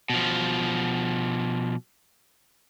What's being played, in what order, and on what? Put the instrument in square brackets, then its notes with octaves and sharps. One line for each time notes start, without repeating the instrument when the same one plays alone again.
[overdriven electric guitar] B2 F3